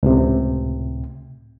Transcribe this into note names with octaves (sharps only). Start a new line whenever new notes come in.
C#2 A2 C3